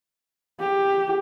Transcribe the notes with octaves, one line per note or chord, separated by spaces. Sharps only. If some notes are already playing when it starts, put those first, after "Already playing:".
G4